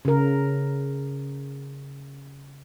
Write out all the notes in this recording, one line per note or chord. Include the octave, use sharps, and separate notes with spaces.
C#3 A#4